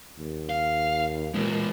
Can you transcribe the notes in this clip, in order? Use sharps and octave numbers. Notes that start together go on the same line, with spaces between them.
D#2
F5
A#2 E3 G#3